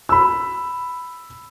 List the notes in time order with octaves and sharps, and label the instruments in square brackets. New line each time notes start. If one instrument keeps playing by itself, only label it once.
[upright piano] B5 E6